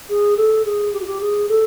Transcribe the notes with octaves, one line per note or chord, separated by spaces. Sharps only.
G#4
A4
G#4
G4
F#4
G4
G#4
A4